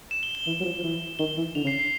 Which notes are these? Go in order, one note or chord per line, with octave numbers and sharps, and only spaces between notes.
E7
G7
G7
E3
F#3
F3
F3
E3
D#3 G7
E3
D3 F7
C#3
C7
C7